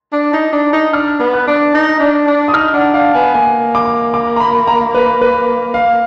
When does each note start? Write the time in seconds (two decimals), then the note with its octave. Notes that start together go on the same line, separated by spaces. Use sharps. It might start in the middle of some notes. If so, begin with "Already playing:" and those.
0.13 D4
0.33 D#4
0.53 D4
0.73 D#4
0.93 D4 F6
1.20 B3
1.33 F#6
1.47 D4
1.74 D#4
2.00 D4
2.27 D4
2.48 D#6
2.53 D#4 F6
2.74 D4 F#5
2.94 D4 F5
3.15 B3 G#5
3.34 A#3 G#5
3.75 D6
4.14 D6
4.36 A#5
4.40 B5
4.67 A#5
4.94 B4
5.21 B4
5.74 F5